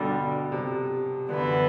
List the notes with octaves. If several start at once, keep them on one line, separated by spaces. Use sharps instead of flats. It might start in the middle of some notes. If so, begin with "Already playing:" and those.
Already playing: G2 B2 D3 G3
C3
F#2 D3 E3 B3 E4